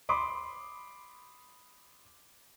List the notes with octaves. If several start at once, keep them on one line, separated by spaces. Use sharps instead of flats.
B5 C6 D6 D#6